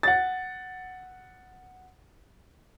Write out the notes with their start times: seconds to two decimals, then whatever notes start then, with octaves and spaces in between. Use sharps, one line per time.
0.03 F#5 A6